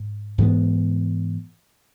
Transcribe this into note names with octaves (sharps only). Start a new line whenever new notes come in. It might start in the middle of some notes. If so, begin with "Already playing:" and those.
Already playing: G#2
G#2 E3 G#3 B3